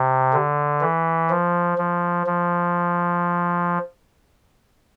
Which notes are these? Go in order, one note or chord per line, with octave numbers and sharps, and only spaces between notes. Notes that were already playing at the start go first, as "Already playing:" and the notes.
Already playing: C3
D3
E3
F3
F3
F3